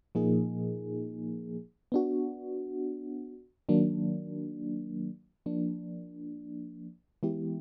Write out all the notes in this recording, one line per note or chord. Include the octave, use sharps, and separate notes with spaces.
A#2 F3 A#3 D#4 G#4
B3 D4 F#4
D#3 F#3 A#3 D4
F3 A#3 D4
E3 G#3 B3 E4 G4